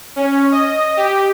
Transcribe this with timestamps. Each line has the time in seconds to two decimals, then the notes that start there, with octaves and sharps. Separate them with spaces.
0.16 C#4
0.52 D#5
0.97 G4